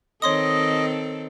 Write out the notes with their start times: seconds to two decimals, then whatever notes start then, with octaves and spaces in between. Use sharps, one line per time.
0.22 D#3 C4 A4 C#5 D#5 C6 D#6